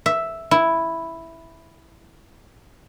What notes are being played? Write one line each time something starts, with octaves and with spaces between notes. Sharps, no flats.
E5
E4